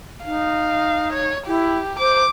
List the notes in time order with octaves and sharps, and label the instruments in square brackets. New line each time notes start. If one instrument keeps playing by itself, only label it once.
[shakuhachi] D#4 [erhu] F5
[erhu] C#5
[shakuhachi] E4 [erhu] G4
[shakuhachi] C5 [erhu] D6